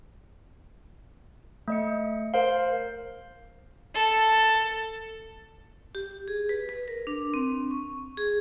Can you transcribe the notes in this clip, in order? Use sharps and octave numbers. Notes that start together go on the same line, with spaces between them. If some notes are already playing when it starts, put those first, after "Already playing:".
A3 D#5 C#7
A#4 C5 F5
A4
G4
G#4
B4
B4
A#4
D4
C4
C#6
G#4